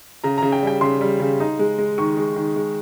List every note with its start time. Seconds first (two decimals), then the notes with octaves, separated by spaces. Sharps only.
0.24 C#3 A#5
0.38 C#3 A#5
0.52 G5
0.63 G3 G5
0.81 C#3 C6
1.01 G3
1.20 C#3
1.40 D#4
1.59 G#3
1.78 G#3
1.98 D#3 C#6
2.17 G#3
2.36 D#3
2.56 G#3